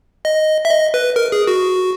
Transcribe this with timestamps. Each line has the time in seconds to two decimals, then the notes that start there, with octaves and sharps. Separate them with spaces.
0.25 D#5
0.65 E5
0.70 D#5
0.94 B4
1.16 A#4
1.32 G#4
1.47 F#4